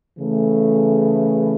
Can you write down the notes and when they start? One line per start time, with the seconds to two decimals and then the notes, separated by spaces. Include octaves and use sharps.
0.18 C#3 E3 A3